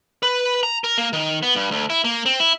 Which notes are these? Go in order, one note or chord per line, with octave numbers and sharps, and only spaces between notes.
B4
A#5
A#4
A#3
D#3
B3
G2
D2
E4
A#3
C4
E4